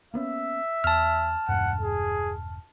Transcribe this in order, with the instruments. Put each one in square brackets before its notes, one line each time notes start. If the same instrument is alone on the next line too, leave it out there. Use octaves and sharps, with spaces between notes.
[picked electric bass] A#3 B3 C#4 [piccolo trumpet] E5
[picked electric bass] E2 [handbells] A5 F6
[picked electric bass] E1 G2 [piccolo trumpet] F#5
[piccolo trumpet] G#4